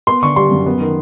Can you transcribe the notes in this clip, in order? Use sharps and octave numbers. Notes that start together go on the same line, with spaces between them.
B3 C6
D3 C#6
G3 C6
F#2
B3
D#3